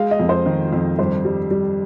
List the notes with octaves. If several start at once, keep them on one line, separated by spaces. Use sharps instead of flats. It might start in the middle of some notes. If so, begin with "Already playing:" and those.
Already playing: G#3 F5
D#5
F2
C5
D#3
F2
G2 C5
G3
G3